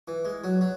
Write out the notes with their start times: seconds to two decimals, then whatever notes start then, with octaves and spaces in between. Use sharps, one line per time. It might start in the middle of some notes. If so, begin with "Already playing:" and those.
0.08 E3
0.25 G#3
0.44 F#3
0.61 F#3